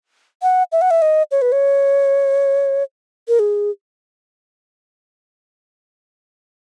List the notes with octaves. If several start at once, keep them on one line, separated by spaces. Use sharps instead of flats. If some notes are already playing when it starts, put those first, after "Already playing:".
F#5
E5
F#5
E5
D#5
C#5
B4
C#5
A#4
G#4